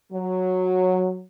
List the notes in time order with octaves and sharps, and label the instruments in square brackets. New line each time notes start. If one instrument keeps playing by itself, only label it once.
[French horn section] F#3